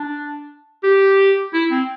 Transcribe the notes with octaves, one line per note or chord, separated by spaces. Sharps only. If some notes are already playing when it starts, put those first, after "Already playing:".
Already playing: D4
G4
E4
C4